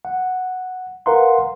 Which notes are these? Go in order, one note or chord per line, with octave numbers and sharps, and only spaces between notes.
F#5
A#4 B4 F5 F#5 A#5 C6